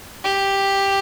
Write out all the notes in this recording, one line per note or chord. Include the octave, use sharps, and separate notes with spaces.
G4